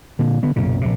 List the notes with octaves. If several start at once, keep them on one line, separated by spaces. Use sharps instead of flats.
A#2 D3
D3 B3
B1 F#2 A#2 C#3
A#1 C3